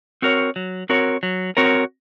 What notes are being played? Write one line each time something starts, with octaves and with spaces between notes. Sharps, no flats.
C4 F#4 A#4 C#5
F#3
C4 F#4 A#4 C#5
F#3
C4 F#4 A#4 C#5